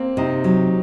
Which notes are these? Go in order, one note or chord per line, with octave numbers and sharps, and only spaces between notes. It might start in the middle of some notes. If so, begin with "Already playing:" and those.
Already playing: A#3 C4
C3 D#4
F#3